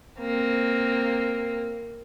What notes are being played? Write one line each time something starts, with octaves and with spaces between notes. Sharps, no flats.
A#3 C4